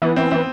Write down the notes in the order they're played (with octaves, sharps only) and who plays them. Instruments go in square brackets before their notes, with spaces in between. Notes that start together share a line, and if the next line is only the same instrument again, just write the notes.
[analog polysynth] E3 [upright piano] B3
[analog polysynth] E3 [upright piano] C4
[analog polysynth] E3 [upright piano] C4